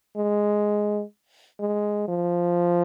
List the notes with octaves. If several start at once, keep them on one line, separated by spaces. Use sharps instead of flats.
G#3
G#3
F3